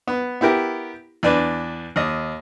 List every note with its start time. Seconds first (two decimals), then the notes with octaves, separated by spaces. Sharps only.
0.07 B3
0.41 B3 E4 G4 A#4
1.23 E2 D4 B4
1.96 D#2 D#5